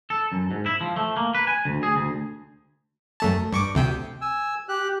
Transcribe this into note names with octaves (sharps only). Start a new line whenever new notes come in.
A4
F#2
G#2
E4
F3
A3
A#3
B4
G#5
D2
G#4
D2
F#2 A3 A5
G2 C#6 D6
D2 C3 G5
G#5 E6
G4 F#6